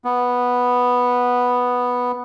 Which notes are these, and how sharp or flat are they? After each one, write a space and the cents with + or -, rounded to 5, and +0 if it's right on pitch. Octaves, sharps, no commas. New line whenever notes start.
B3 -5